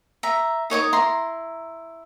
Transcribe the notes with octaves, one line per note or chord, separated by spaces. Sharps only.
E5 A#5
D#4 C#5 D#5 D6
E4 A#5 C6